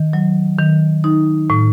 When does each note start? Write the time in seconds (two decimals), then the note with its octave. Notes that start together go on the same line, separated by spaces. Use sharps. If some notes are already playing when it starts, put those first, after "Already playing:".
Already playing: D#3
0.13 F#3
0.59 D#3
1.04 D#4
1.50 A2